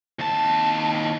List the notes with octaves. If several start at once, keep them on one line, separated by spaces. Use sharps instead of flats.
D#2 A5